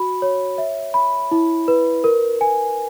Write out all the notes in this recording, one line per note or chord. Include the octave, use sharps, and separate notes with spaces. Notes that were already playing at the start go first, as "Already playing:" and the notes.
Already playing: F#4 B5
C#5
E5
B5
E4
B4
A#4
G#5